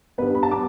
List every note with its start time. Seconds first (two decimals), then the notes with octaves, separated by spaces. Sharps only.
0.18 G2 G3 B3 B4
0.35 B5
0.43 A5
0.51 G3 B3 D6